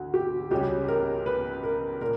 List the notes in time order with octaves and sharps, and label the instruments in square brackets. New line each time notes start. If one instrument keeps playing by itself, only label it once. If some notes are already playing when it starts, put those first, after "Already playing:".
Already playing: [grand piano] D2 D3 [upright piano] F#4
[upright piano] G4
[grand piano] C#2 C#3 G3 C#4 [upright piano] G4
[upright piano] A#4
B4
A#4
[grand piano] A#2 [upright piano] A#4